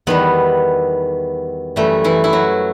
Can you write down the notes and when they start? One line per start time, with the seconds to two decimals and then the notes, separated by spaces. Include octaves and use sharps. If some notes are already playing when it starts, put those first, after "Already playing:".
0.07 E2 D#3 G3 B3
1.76 F#2 E3 G3 A3
2.04 E3 E4
2.24 E4
2.33 F#3 F#4